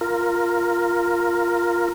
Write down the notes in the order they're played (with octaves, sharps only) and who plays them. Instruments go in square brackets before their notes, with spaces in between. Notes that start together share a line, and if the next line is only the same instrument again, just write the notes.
[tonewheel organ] F4 A#4